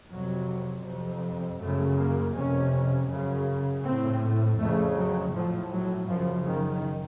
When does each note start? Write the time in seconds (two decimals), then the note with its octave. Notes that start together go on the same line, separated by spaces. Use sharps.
0.11 F2 C3 F#3
0.86 F2 C3
1.60 F#2 C#3 A3
1.98 A#3
2.35 F2 C3 C#4
3.10 F#2 C#3
3.84 A2 C4
4.59 F2 C#3 A3
4.96 F#3
5.35 A2 F3
5.71 F#3
6.09 F#2 C#3 F3
6.47 D#3